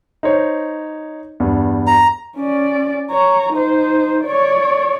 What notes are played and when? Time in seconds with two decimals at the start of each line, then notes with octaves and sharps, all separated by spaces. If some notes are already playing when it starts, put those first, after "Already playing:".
0.23 D#4 C5 C#5
1.40 E2 G2
1.87 A#5
2.36 C#4 D5
3.11 C#5 A#5
3.53 D#4 C5
4.24 C#5 D5